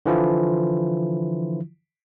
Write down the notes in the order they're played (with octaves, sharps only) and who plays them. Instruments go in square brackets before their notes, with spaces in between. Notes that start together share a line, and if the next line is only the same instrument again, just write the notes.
[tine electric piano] D3 E3 F3 E4 F4